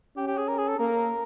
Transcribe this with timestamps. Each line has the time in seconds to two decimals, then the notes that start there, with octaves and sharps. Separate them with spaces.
0.17 C#4 G4
0.27 G4
0.38 G#4
0.48 A#4
0.58 G#4
0.68 A4
0.79 A#3 A#4